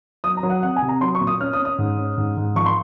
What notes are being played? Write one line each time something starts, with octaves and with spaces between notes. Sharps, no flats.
F#3 D#6
A#5
F#3
F#5
F2 F#5
G#5
C3
A#5
F#3 C6
C#6
A#2
D#6
C#4 F6
D#6
C#4
D#6
G#2
C#4
G#2
G#2
F3 C#6
C6